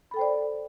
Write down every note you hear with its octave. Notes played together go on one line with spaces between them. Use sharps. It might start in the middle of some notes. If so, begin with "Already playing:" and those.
A4 C5 D5 G5 B5